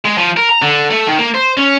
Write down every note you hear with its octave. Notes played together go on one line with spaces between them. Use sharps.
G#3
F3
A#4
A#5
D3
A3
D#3
A#3
C5
C#4